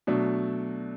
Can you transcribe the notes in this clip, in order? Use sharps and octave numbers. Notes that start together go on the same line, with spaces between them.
B2 F#3 A3 D4